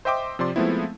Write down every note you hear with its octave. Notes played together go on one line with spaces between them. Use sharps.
C5 D#5 E5 G5 C6 D6
C3 F3 D5 C6
F3 G#3 A3 B3 C4 E4